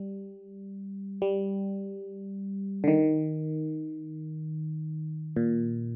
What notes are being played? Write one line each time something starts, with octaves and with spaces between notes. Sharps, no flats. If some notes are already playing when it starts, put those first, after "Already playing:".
Already playing: G3
G3
D3
D#3
A#2